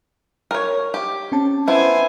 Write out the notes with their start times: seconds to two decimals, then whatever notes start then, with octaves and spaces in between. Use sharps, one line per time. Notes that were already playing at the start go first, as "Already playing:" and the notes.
0.51 A#4 C#5
0.94 G4
1.32 C4 C#4 A5
1.68 B3 E4 C5 G#5